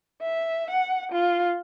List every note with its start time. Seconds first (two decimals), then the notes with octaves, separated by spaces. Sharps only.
0.22 E5
0.70 F#5
1.12 F4